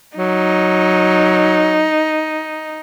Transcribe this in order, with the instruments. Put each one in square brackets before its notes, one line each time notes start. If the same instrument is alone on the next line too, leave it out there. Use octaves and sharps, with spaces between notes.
[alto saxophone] F#3 [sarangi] D#4